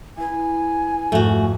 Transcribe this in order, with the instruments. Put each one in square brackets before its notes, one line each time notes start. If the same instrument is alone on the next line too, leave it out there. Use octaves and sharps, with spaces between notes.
[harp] E4 B4 [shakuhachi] G#5
[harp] F2 G#2 [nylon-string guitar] A3 F#4